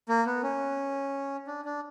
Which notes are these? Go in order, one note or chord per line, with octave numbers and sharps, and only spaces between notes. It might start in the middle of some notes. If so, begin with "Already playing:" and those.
A#3
B3
C#4
D4
D4